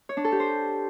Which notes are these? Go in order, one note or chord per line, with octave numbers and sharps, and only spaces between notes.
C#5
D4
A4
G4
C5